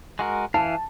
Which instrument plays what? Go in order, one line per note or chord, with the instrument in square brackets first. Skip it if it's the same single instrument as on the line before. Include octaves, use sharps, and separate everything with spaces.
[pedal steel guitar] G#3 F#4 A#4
[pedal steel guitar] E3 E4 F5 [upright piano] A5